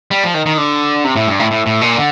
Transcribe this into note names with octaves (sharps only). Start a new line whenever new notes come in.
G3
F3
D#3
D#3
D3
C3
A2
G2
A2
A2
A2
A#2
D3